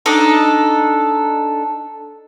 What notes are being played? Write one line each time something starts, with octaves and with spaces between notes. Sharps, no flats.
D4 D#4 A4